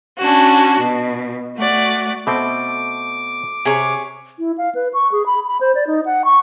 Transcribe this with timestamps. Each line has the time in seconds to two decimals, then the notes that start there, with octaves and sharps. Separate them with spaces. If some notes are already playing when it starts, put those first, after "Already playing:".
0.18 C#4 D4 F#4
0.79 B2
1.56 A3 F#4 D5
2.27 B2 A3 C4 D6
3.65 C3 G#4 C#5
4.39 E4
4.58 F5
4.75 B4
4.94 C#6
5.12 G#4
5.26 B5
5.47 B5
5.61 C5
5.75 D5
5.87 D#4
6.06 F#5
6.25 C#6